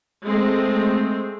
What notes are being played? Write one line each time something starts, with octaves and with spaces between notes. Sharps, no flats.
G#3 A3 C4